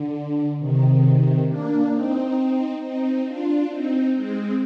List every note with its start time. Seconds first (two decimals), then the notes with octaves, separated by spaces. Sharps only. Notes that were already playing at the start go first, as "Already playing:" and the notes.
Already playing: D3
0.58 C3 D#3
1.47 A#3 D4
1.92 C4 D#4
2.80 C4 D#4
3.26 D4 F4
3.69 C4 D#4
4.14 G#3 C4